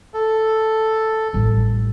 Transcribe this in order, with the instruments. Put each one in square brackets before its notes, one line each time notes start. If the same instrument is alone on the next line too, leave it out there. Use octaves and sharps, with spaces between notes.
[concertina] A4
[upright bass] A1 G3